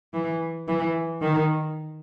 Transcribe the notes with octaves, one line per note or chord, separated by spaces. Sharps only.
E3
E3
D#3